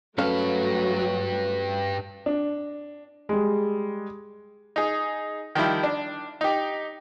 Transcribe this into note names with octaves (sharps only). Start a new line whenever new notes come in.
G2 F#3 A3 C#4 A4 B4 F5
D4
G3 G#3
D#4 G#4
D#3 F3 G3 E4
D4
D#4 G4